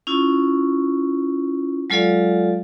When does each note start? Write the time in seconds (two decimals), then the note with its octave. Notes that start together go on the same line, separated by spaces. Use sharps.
0.07 C#4 E4 F4
1.90 F#3 G#3 F4 A4 D5 F5